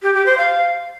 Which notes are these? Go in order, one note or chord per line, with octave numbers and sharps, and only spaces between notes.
G4
G4
C5
F5